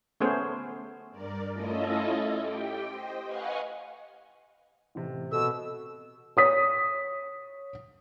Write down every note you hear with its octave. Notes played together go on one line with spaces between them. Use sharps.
A3 B3 C#4 G#4 C5
G2 A#4 D5
A3 C#4 E4 F4 A4 D#5
G4 G5
C5 D#5
B4 D#5 F5 F#5 G#5 C#6
A1 C3
B2 A4 E6
C#5 D#6 B6